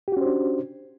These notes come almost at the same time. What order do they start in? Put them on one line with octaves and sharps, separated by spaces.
G4 F#4 C#4 C5 D4